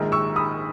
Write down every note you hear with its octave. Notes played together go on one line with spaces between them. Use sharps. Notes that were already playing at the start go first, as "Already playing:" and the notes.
Already playing: A#1 G#2 D#3 G#3
C#6 E6
B5 D#6